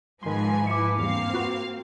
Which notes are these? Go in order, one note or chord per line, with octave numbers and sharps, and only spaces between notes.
G#2 D#3 F3 G#3 B4 G#5 C6
E4 B4 D6 C#7
E2 G2 A#3 C4 F5
F4 F#4 B4